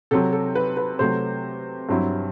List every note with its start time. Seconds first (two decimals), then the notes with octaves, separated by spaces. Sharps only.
0.11 C3 F#3 C4 A4
0.32 A4
0.55 B4
0.77 B4
0.99 C3 F#3 A3 C5
1.89 G2 F#3 C4 E4